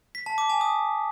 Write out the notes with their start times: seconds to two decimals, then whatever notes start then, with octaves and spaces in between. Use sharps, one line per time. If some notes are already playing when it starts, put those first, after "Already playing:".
0.15 B6
0.26 A5
0.38 D6
0.49 G#5
0.61 D#6